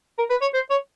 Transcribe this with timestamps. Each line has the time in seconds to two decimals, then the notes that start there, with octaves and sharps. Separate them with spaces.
0.18 A#4
0.30 B4
0.41 C#5
0.54 C5
0.70 C#5